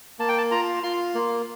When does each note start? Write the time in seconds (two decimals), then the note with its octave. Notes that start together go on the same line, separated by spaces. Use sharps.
0.19 A#3 A5
0.29 G5
0.38 A5
0.51 F4 A#5
0.83 F4 C6
1.15 A#3